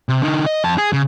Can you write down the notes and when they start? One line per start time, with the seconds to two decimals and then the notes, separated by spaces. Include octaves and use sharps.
0.09 C3
0.22 D3 D#4
0.46 D#5
0.64 F2 A5
0.78 G#4
0.93 C#3